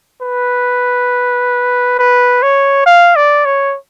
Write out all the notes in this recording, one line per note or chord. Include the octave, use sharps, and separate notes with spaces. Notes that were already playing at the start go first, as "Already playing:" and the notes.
B4
B4
C#5
F5
D5
C#5